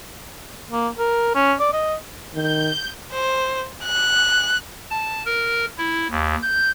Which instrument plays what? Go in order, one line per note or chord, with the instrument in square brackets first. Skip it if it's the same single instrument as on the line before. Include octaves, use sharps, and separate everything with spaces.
[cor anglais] A#3
A#4
C#4
D5
D#5
[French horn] D#3 [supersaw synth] G6
[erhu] C5
F#6
[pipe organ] A5
A#4
E4
D#2
G6